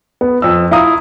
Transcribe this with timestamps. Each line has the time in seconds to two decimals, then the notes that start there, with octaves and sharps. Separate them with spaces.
0.21 B3
0.42 F2 E6
0.71 E4 F4 F5 A#5 D#6